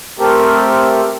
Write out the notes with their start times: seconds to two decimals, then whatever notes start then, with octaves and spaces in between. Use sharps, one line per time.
0.19 A3 C4 G4 A4 A#4